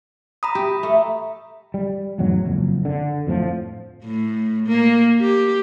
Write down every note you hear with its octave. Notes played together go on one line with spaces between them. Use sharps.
A#5 B5 D#6
G4
A3
G3
F1 E2 G#2 F#3
F#1 F2
D3
F2 A2 F3
A2
A#3
G4